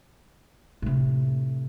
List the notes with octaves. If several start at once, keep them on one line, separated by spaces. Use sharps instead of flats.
A2 C3